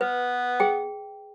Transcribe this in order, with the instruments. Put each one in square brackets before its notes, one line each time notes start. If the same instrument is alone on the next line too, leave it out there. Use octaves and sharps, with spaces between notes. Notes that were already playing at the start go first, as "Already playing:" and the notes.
[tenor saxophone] B3 [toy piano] B4
[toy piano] G#4 G5